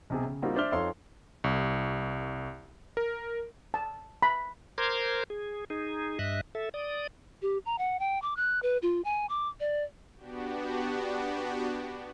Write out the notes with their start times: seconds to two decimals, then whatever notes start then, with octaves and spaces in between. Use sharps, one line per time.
0.10 B1 C3 G#4
0.24 C#3
0.42 G3 A#3 C4 D#4 F4 F#4
0.56 D4 C5 D5 E5 F6 G7
0.72 F2 D#4 A4 C#5 F5 C6
1.44 C2
2.97 A#4
3.74 A5
4.22 B5
4.78 A#4 C5 A#5 C6 D6 G#6
5.30 G#4
5.70 D#4 G#4
6.19 G2 D#5 E5 F#6
6.55 A4 E5
6.74 D5 D#6
7.42 G4
7.66 A#5
7.78 F#5
8.00 G5
8.22 D6
8.37 F#6
8.63 B4
8.82 F4
9.05 G#5
9.29 D6
9.60 D5
10.17 B3 D4 F#4 G4